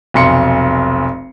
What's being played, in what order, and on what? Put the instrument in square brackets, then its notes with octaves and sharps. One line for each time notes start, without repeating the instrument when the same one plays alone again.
[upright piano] F1 B1 C6 C#7